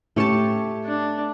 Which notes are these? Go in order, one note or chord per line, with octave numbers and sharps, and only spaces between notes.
A2 A3 C#4 G4 C#5 A5
D4